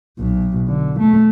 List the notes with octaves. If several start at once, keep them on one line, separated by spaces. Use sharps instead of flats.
B1 B2
D3
A3